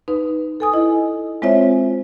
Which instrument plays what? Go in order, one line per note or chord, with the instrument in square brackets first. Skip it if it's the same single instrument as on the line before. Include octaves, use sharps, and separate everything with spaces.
[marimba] D#4 B4
A4 G#5 D#6
E4 D#5
G#3 C4 F4 C5 C#5 E5